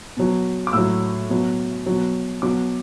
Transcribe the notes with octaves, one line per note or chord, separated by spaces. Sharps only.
B2 F#3
D6
A2 F#3 E6
B2 F#3
B2 F#3
B2 F#3 D6